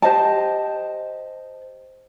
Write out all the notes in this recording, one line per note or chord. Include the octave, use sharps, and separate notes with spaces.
G4 C5 D#5 A5